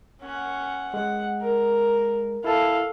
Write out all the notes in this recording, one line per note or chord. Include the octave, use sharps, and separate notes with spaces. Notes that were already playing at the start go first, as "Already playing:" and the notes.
C#4 F#5
G#3 F#5
A#4
E4 A4 F5 A5